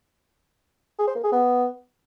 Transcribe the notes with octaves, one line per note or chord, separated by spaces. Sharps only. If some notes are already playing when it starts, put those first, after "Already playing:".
G#4
C5
A#3
G#4
B3